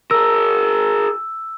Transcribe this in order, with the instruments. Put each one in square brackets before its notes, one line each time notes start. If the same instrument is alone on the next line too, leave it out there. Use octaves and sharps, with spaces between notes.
[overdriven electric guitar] G#4 A#4 [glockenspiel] E6